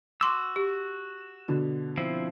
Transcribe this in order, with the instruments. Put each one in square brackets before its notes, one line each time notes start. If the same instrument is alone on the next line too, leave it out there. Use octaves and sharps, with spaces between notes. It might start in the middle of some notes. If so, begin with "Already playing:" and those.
[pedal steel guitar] F#4 E6 [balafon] C6 D6
[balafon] G4
[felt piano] B2 D3 D4
[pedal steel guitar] F3 C4 E4